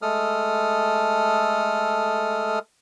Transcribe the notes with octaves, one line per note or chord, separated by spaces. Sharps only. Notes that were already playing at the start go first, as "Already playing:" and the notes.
G#3 A3 A4 D#6 F6